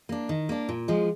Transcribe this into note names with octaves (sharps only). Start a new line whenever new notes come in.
A#3 D4
D#3
A#3 D4
A#2
F3 G#3